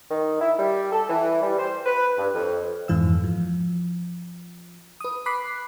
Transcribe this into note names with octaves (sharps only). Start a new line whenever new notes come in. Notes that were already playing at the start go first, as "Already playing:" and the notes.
D#3
E4
G3
A4
E3
G3
C5
B4
G2
F2
F2 G#2 E3 F5 E6
F3
B4 D#6
B5 D6 F#6 B6 C7